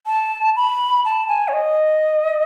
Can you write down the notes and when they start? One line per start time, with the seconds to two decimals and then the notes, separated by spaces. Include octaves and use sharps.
0.06 A5
0.56 B5
1.05 A5
1.28 G#5
1.48 C#5
1.53 D#5